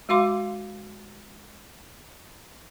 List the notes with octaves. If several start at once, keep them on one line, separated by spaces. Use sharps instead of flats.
G#3 F#4 F5 C6 D6